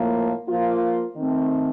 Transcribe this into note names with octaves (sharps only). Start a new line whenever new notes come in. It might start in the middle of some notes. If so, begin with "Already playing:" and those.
Already playing: A2 F3 A#3
F3 A#3 F4
D#3 A3 C4